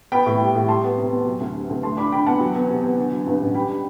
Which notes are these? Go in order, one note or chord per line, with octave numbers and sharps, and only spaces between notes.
B3 G5 B5
A2
G3
A2
G3 A5 C6
B3
C3
E2
F#3
D2
C3
D2
A3 A5 C6
D4 B5 D6
D3 G5 B5
E2 F#5 A5
F#3
E2
C3
E2
D3
F#3
G2
A1
G3 G5 B5
D4